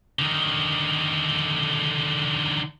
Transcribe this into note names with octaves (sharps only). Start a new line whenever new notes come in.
D3 D#3